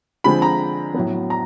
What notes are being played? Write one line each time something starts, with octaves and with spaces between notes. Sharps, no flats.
D3 F3 G#3 C4 B5
A#5
A2 F#3 B3
A#5